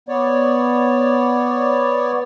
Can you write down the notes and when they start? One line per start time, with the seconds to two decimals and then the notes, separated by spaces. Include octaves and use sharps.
0.09 B3 C#5 D5